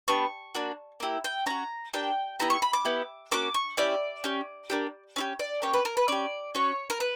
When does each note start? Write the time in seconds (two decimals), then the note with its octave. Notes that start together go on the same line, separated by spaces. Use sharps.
0.08 B3 D4 G4 C#6
0.55 A#3 D4 F#4
1.00 A#3 E4 G4
1.24 G5
1.46 C#4 F#4 A#5
1.93 A#3 D4 G4 G5
2.40 B3 E4 G4 A#5
2.50 C#6
2.62 B5
2.73 D6
2.85 B3 E4 G4
3.31 A#3 C#4 F#4 D6
3.54 C#6
3.77 C#4 E4 G4 D5
4.24 C#4 G4
4.70 A#3 D4 G4
5.16 C#4 E4 G4
5.39 D5
5.62 A#3 C#4 G4 C#5
5.74 B4
5.85 A#4
5.97 B4
6.08 C#4 G4 D5
6.55 C#4 F#4 C#5
6.90 A#4
7.00 B4